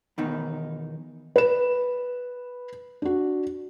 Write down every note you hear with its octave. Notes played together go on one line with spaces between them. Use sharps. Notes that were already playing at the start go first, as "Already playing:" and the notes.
E2 B2 D#3 D#4
B4 E7
D4 F#4